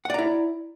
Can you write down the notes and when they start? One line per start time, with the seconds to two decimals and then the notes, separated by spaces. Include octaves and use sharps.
0.05 F#5
0.10 D5
0.14 A#5
0.19 E4